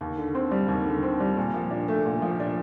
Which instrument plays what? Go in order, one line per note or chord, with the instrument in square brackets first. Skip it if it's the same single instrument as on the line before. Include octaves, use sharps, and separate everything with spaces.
[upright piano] D#2
D3
C4
G3
D#2
D3
C4
G3
A#2
F3
D4
A3
A#2
F3
D4